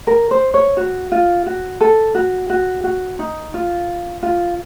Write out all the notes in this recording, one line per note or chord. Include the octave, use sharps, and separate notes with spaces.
A#4
C5
C#5
F#4
F4
F#4
A4
F#4
F#4
F#4
D#4
F4
F4